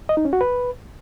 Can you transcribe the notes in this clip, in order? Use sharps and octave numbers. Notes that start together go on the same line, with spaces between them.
D#5
D#4
C#4
F#4
B4